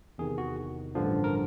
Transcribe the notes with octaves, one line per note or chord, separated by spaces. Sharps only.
E2 C3 D#3 G#4
F#4
A1 G2 D3 F3
A#4